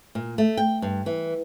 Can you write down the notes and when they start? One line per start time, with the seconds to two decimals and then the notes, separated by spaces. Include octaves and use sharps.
0.15 A#2
0.38 A3
0.57 G5
0.82 G2
1.06 E3